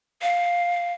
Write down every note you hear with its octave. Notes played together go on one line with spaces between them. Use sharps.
F5